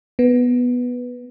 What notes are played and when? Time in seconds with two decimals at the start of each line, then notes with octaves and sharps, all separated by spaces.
0.19 B3